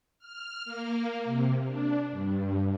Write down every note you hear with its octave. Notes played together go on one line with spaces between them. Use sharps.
F6
A#3
C3
D4
G2